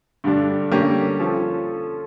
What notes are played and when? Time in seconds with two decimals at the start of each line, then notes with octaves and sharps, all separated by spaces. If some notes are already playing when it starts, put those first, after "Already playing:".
0.24 G2 D3 G3 D4
0.71 D3 G3 A#3 C#4 G4
1.19 F3 C#4 F4 A4